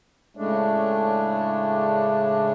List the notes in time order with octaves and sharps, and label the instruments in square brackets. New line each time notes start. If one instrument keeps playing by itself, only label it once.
[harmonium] A2 C#3 G#3 A3 D4